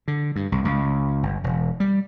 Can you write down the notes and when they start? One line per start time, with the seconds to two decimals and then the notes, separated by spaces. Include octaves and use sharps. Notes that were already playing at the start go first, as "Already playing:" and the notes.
0.08 D3
0.36 G2
0.52 C2
0.65 C#2
1.23 G1
1.44 E1
1.80 G3